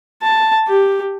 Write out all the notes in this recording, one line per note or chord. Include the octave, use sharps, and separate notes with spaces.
A5
G4